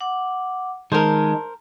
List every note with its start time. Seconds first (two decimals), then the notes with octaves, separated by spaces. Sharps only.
0.01 F#5 D6
0.92 D#3 G#3 A#4 C5 A5